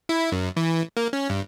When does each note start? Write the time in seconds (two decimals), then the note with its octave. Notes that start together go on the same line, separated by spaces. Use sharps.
0.09 E4
0.32 F#2
0.57 E3
0.97 A#3
1.13 C#4
1.30 G2